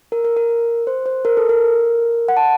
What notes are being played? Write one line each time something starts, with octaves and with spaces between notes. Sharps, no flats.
A#4
A#4
A#4
C5
C5
A#4
A4
A#4
F#5
A5